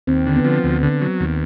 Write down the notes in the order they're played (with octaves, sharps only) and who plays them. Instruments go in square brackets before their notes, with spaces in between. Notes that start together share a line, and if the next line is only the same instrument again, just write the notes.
[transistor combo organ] D#2 [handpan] C4
[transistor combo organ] D3
[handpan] B3
[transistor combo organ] F3
D2
D3
F#3
D#2